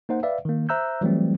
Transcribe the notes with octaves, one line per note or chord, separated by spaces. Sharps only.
A#3 D#4 C5 F#5
B4 D5 E5 F5
D#3 A#3
C5 E5 A#5 E6 F#6 G6
E3 F#3 G3 A3 C4